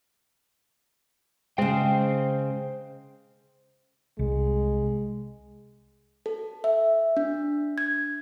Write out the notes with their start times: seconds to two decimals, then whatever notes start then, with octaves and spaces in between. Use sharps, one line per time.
1.58 C#3 G#3 C5 G5
4.19 C2 G#3
6.26 A4
6.64 E5
7.17 D4
7.78 G#6